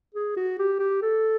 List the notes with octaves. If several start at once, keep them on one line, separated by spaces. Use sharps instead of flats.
G#4
F#4
G4
G4
A4